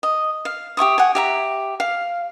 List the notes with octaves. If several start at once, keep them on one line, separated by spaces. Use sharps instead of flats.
D#5
F5
G4 E5 C#6 D#6
F#5 G#5
G4 E5 A#5
F5